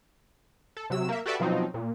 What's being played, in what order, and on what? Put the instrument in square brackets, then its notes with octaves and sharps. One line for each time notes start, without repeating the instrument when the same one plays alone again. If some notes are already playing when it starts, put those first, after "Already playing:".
[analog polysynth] A4
C3 F#3 E6
A#3 E5
F#4 G4 A4 B4 D5 E5
B2 F3 F#3 C4 D#4
A#2